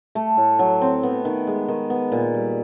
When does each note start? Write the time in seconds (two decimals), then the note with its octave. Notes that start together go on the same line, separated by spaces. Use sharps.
0.15 A3
0.37 A2
0.59 F#3
0.82 C4
1.03 B3
1.25 D#3
1.47 G#3
1.68 D#3
1.90 B3
2.12 A#2
2.34 G3